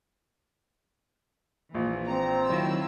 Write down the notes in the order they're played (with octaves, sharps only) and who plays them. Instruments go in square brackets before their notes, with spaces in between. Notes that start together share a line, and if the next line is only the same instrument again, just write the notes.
[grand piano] A#1 [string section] A#2 E3
[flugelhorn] C4 [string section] A#5
[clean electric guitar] D#3 F#3 [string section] E4 F4 E6